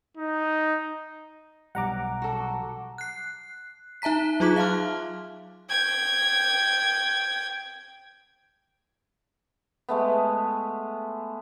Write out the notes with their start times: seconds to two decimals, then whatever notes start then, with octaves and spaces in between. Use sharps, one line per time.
0.17 D#4
1.75 B1 G3 F#5 A#5 D6
2.22 F#4 A4
2.98 F#6 C7
4.02 D#4 E5 A5 A#5 B6
4.40 F#3 D#4 F4 G#4 D6 F#6
4.56 E5 F5 A5 C6 F6
5.69 G5 G#6
9.89 G#3 A3 B3